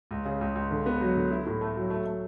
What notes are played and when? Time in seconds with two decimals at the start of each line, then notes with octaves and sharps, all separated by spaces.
0.11 C#2
0.25 C#3
0.41 C#2
0.55 C#2
0.71 D3
0.86 B3
1.01 F#3
1.15 D3
1.31 E4
1.46 A2
1.61 A3
1.76 F#3
1.90 A3
2.06 A3